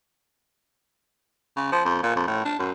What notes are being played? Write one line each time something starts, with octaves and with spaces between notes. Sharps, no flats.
C#3
F3
F2
A#2
F2
A2
D4
F#2